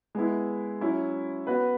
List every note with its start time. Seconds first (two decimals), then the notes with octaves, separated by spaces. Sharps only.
0.15 G#3 B3 E4
0.81 F#3 C#4 E4
1.47 B3 F#4 B4